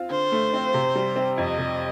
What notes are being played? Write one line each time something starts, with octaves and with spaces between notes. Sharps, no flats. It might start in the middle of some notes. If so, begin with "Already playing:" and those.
Already playing: C4 F4
D3 C5
A3
C4
C3
G3
C4
F2 D#5
C3